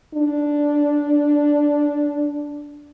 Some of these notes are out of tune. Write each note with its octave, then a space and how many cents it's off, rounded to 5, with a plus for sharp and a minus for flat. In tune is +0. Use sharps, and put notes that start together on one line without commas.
D4 -5